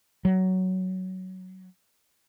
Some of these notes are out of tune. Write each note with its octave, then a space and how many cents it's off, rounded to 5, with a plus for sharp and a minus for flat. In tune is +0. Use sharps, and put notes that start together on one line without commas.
F#3 +10